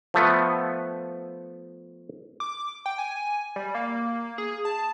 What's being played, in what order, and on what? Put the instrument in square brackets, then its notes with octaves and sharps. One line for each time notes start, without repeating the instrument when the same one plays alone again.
[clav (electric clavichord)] F3 A3 B3
[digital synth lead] D6
G5
G#5
G3
A#3
G#4
A5